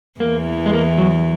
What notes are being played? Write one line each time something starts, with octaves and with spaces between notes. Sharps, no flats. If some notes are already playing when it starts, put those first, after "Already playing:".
E2 E3 A#3
G#3
A#3
F#3